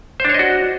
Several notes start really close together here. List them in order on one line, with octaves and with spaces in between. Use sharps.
C5 D4 C#5 D#5 F#4